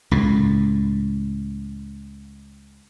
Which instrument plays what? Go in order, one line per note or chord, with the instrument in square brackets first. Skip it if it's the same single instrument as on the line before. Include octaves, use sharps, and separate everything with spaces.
[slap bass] C#2 A2